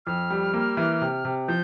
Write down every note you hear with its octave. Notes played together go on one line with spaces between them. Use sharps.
F2 F6
G3
A#3
E3
C3
C3
F3 G6